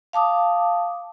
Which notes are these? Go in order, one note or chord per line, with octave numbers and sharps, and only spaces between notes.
F5 A5 D6 D#6